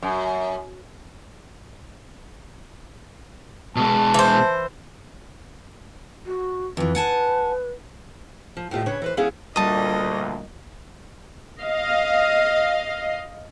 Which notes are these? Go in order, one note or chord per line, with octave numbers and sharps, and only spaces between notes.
F#2
B2 G#3 A5
E3 C5
F#4
F2 E3 B4
F#5 G#5 A5
F3
A2 C3 A3 F4 G4 D#5
C#3 C#4 D4 B4 C#5
E3 B4 C5
E2 B3 C#4 E4 G#4 F5
D2 A#2 G3 D#5 A5 D#6
D#5 F5